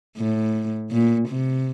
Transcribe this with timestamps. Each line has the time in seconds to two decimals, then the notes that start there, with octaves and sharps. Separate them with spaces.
0.18 A2
0.92 A#2
1.29 C3